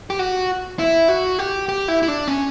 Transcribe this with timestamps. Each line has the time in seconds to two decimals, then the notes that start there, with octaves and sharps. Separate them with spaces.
0.10 G4
0.19 F#4
0.79 E4
1.08 F#4
1.39 G4
1.69 G4
1.88 E4
2.03 E4
2.08 D4
2.28 C#4